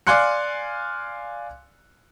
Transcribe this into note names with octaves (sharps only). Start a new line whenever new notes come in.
D5 F5 G#5 C6 F#6 C#7